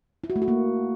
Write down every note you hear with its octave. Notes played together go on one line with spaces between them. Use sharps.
E4
F#4
A3
F#4
A#3